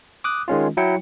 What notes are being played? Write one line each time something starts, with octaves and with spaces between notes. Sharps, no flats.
D6 D#6 F#6
D#3 G#3 C#4 F4
F#3 E4 G5 C#7